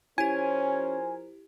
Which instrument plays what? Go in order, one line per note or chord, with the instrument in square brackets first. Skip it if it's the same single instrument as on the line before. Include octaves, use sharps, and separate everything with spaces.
[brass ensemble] F3 A#4 C5 [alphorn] C#4 [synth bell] E4 G4 [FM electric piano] G#5